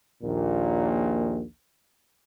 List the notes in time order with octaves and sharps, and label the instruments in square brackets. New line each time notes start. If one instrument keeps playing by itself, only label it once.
[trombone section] A#1 D#2 A#2